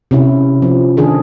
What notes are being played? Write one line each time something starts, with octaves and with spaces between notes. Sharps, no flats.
C3 C#4 E4
F3 C4
D#3 D4 G#4 A4